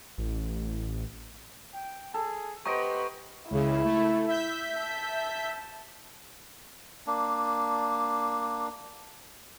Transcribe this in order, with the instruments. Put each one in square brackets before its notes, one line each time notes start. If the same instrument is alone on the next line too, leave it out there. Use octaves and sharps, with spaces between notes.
[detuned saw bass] A1
[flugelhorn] G5
[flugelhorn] G#4 [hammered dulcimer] A4
[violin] B3 B5 [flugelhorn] G4 [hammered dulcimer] C5 D#5 A#5 [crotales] C#6 D7
[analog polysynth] C#2 C#3 [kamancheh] E4
[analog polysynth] A3
E5 G6 B6
[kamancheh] A5
[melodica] A#3 D4